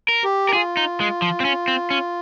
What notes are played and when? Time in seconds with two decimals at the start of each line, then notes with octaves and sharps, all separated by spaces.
0.08 A#4
0.24 G4
0.49 A#4
0.53 F4 G#4
0.77 D#4
1.00 G#3
1.22 F3
1.40 C4
1.45 C#4
1.68 C4
1.90 C#4